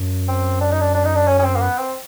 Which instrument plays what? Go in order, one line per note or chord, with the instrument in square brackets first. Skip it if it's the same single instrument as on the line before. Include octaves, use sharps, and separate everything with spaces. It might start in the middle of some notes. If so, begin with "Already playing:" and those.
Already playing: [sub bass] F#2
[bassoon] C4
D4
D#4
D4
D4
D#4
D4
C#4
C#4
C4
A#3
B3
C4